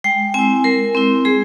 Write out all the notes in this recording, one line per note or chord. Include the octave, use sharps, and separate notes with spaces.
G#3 G5
C4 E4 G#5
G#3 A#4
C4 E4
G#3 G#4